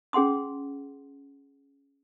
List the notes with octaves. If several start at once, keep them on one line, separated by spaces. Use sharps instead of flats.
C#4 G#4 F#5 C6 D#6